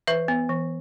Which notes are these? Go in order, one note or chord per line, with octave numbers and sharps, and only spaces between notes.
E3 B4 E5
B3
E3